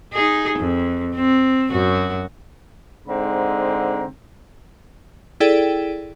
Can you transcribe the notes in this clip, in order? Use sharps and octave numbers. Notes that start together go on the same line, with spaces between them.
D#4 G#4
F2
C4
F#2 F#4
G#2 D3 C4 A#5
E4 G#4 A4 D5 G5